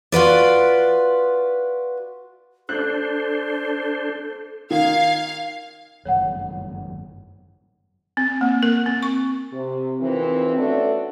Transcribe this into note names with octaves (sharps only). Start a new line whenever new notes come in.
F4 F#4 B4 D5
D4 A4 C5 F#6
D#3 F5 G#6
G1 F#2 D#3 C#5 F#5
C4
A#3
A#4
C4
C#6
C3
F2 D#3 E3 C4
A3 B3 C#4 D4 F#4 A4